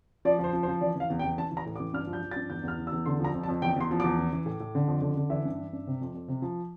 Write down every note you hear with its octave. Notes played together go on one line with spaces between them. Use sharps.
F3 D5
F3 C5
F3
C5
F3
E3 D5
E3 F5
E2
G5
E2
E3 A5
E3
A#5
A2
D6
E3
G2 F6
F3
G6
F3
A6
G2
E2 G6
E2 F6
E3
E6
E2
D3 C6
F3
A#5
F2
A5
F2
E2 G5
E2 C6
F3
E2 D6
E3
E3
A2
A2
D3
F2
D3
D3
E3 E5
G2
E3
G2
C3
F2
F2
C3
F3